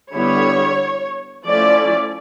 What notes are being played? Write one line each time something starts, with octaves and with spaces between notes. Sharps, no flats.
D3 G3 B3 E4 C#5
F3 A3 C#4 E4 D5